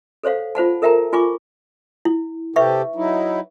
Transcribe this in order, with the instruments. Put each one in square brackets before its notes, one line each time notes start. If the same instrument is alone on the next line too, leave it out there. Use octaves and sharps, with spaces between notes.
[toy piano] A4 C5 C#5 F5 F#5
F4 C5 F#5 A5
A4 A#4 E5 G5 A5 A#5
F4 G#5 C#6 D6
E4
[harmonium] C3 G4 A4 [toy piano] B4 E5 C#6
[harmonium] F#3 D#4 E4